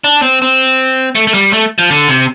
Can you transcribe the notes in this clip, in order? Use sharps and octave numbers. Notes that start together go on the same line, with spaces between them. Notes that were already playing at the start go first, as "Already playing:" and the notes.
D4
C4
C4
A3
A3
G3
A3
F3
D3
C3